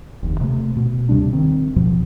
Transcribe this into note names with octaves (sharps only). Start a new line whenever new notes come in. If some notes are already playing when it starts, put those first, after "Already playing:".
F1 D#2
C3 A3
B2
D#2 C3 G3 D4
D#3 C4
E2 B2 F3 F#3